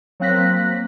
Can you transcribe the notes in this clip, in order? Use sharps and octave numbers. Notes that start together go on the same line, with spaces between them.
F#3 A#3 C4 F#6 A#6 B6